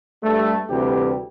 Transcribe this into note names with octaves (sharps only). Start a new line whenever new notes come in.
G2 G3 A3
D2 C3 E3 G3 G4